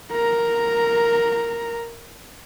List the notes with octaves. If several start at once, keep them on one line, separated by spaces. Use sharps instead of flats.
A#4 A#5